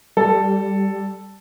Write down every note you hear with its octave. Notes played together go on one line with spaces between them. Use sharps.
G3 A4